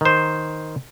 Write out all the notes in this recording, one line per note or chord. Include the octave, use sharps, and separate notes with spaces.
D#3 C5